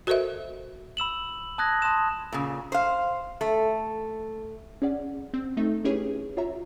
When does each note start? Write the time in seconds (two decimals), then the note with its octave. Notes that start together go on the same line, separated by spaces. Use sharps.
0.07 F#4 A4 A#4 C5 D#5 E5
0.97 B5 E6 E7 F#7
1.58 A5 D#6 F#6 G#6 A#6
1.82 A5 C6 D#6 E7
2.32 A#2 C#3
2.72 C5 F5
3.41 A3
4.82 C#4 G#4 D5 F#5
5.34 C4
5.57 A3 C4 D#4 A4 E5
5.85 C#4 E4 G4 G#4 B4 C#5
6.37 F4 F#4 C#5 E5 A#5